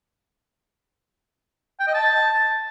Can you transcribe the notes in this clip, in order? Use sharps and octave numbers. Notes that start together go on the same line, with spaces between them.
G5
D#5
A5